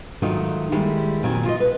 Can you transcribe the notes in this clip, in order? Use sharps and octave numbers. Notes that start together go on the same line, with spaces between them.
G#2 D#3 F#3 A3 D#4 F4
D#3 G3 G#3 A#3 E4
F2 A#2 D#3 F#3 C4 G#5
F4 C#5 D#5
B4